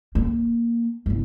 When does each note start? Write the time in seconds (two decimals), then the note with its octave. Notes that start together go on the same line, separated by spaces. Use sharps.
0.15 A#3
1.06 G1 C2